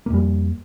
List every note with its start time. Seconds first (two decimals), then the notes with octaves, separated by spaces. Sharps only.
0.06 A#3
0.10 F2
0.14 G3